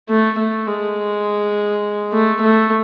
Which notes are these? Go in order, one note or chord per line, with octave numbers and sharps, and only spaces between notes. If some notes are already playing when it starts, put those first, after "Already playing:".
A3
A3
G#3
A3
A3